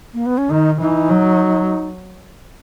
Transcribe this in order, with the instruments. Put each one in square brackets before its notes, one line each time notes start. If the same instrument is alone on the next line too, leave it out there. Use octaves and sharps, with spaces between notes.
[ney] A#3
B3
C#4
[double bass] D#3 [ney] D#4
[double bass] E3 [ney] D#4
[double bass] F#3